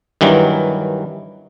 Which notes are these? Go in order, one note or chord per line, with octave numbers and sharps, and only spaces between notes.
G2 D#3 E3 F#3